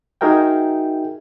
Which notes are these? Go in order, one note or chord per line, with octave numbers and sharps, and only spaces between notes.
D#4 F#4 G#4 A#4 E5 G5